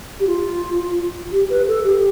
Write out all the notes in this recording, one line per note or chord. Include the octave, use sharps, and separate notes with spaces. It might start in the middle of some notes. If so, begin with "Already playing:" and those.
G4
F4
G4
B4
A4
G4